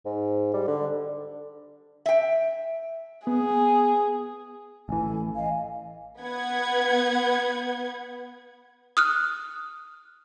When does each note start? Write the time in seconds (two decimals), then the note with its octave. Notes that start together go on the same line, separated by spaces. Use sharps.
0.05 G#2
0.54 G3
0.67 D3
2.06 E5 G5
3.27 B3 G#4
4.89 A1 E3 A4 G#5
5.35 D#5 F5 G#5
6.22 B3 B4 F#5 G#6
8.97 D#6 F6 F#6